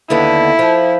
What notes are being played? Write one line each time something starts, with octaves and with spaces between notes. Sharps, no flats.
D#2 D3 B3 E4
F3